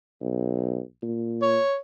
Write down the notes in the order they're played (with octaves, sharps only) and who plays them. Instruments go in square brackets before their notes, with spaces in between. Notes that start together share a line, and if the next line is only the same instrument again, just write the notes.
[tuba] B1
A#2
[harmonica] C#5